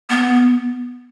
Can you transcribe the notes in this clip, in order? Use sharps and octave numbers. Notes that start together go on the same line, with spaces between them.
B3